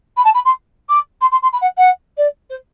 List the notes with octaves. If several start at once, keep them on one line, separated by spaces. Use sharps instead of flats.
B5
A5
B5
C6
D6
C6
C6
C6
B5
F#5
F#5
D5
C5